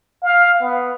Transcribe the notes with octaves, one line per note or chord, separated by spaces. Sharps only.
F5
B3